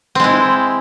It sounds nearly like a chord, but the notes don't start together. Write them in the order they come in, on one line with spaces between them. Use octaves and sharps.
C4 G#3 E4